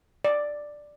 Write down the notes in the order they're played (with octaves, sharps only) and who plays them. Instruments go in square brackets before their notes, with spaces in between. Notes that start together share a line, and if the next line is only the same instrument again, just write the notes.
[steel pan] D5